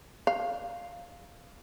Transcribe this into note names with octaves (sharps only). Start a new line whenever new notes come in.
F5